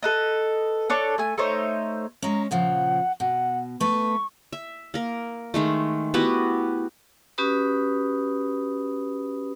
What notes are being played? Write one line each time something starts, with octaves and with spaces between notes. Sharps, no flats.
A4 B4 D#5
D4 A4 C#5
A3 G#5
A3 D#4 C5 C#5
G#3 C#4 A#5
A#2 C#3 F3 F#5
B2 F#5
A3 B4 C#6
E5
A#3 A#4
D#3 G#3 A3
B3 E4 F#4 G4
C#4 F#4 G4 B4 B5 D#6